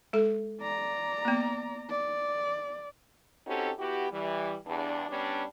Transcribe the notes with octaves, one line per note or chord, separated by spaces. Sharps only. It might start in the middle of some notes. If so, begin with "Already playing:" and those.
G#3 A4
D5 A#5
A#3 B3
D5
C4 C#4 D#4 F#4 G4 A4
B3 E4 F#4 G4
E3 G3
E2 G2 D4
G3 B3 C#4 D4